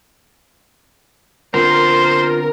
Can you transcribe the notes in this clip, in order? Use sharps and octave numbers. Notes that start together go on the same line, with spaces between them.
D3 B3 C4 F4 A#4 C5